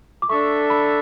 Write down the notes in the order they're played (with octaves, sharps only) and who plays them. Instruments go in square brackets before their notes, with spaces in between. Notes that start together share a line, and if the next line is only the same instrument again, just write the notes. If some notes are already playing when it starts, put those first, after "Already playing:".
[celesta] D6
[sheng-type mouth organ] D4 A4 E5 [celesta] C#6
[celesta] B5